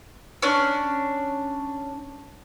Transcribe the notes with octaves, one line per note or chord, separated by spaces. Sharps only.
C#4 D4